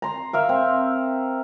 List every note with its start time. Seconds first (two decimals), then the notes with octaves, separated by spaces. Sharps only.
0.02 A#5 C6
0.33 A#4 E5 F5
0.49 C4